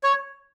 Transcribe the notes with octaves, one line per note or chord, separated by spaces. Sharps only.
C#5